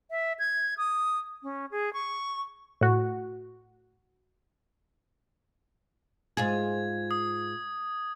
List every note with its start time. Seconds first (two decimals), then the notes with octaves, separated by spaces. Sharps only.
0.11 E5
0.39 G#6
0.78 D#6
1.43 C#4
1.71 G#4
1.93 C#6
2.81 A2 F#4
6.37 G#2 F4 G#4 G#6
7.11 D#6